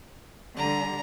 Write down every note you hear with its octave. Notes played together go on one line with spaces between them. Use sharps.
D3 G3 A#5